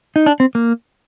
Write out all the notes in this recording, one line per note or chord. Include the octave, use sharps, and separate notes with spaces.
D#4
D4
C4
A#3